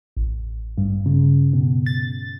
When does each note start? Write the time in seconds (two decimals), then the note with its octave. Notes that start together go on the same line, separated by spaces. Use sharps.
0.17 A1
0.78 G2
1.06 C#3
1.53 B2
1.86 A6